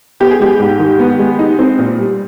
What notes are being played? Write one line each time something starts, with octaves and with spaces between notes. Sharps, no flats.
B3 G4
G#4
G#3 G4
G#2
D#3
B3
G#3
D#4
C4
A#2
G3